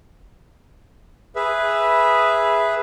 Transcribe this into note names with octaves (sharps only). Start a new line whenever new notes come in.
G#4 B4 E5